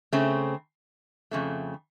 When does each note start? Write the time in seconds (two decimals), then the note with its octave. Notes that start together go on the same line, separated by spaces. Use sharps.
0.13 C#3 A3 C4
1.31 F2 C#3 A3